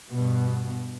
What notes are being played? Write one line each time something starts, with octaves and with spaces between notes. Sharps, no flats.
G2 B2